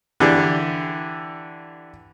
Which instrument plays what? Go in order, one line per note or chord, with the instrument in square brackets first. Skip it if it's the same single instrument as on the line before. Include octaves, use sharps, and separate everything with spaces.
[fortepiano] D3 E3 D4 G4